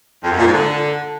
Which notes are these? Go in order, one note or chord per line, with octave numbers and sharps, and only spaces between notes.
F2
F#2
A#2
G#2
D3